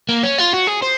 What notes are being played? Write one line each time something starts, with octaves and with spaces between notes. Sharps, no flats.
A#3
C#4
F4
F#4
G#4
C5